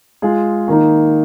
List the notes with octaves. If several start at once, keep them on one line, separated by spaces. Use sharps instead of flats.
G#3 F4 G#4
D#3 A#3 D#4